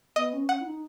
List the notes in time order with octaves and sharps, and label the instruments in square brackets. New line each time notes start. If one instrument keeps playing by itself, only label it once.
[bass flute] B3 [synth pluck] D#5
[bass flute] C#4
[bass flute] C#4 [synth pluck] F#5
[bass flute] E4
D#4